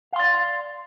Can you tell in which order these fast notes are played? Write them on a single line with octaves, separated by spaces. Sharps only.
F5 C6 D5